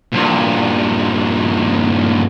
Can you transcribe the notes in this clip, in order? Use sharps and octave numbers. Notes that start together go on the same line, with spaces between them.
G2 A#2